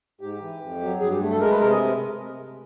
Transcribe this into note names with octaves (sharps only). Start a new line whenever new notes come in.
G#2 G4
E3
F2
F#3
G2 G#4
G4
A3
A4
G#3 A#4
B4
C3 A#4
D#5